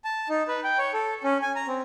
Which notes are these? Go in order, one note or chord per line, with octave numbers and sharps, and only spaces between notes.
A5
D#4
B4
G5
C#5
A4
C#4
G#5
A#5
C4